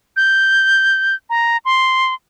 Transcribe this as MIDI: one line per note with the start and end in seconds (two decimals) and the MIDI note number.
0.17 1.15 91
1.30 1.57 82
1.65 2.14 84